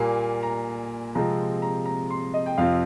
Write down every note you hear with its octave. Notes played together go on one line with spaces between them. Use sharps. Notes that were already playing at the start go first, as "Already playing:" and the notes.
Already playing: A#2 G3 A#3 G#5
A#5
C3 F3 G#3 C4 A#5
A#5
A#5
C6
D#5
G5
F2 C3 F3 C4 F5